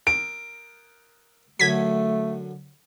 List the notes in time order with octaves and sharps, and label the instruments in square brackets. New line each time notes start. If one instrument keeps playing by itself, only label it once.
[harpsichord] A#4 [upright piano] D7
[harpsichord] F#2 D3 F#3 [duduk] A3 [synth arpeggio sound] G#6 B6